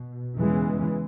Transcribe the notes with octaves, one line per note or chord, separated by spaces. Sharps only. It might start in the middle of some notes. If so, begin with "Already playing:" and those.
Already playing: B2
E2 C#3 E3 G#3